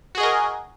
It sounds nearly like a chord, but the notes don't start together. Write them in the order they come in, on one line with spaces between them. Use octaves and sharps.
F#4 G#4 D#5 A#4